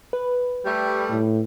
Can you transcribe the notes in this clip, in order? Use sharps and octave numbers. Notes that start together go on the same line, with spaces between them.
B4
G3 A3
A2